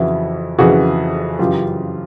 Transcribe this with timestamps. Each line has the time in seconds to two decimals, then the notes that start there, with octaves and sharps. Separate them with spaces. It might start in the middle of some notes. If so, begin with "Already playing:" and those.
Already playing: F2 C#3 E3 E4 F#4
0.58 F2 C#3 E3 F#4 G#4
1.39 F#2 C#3 E3 F4 G4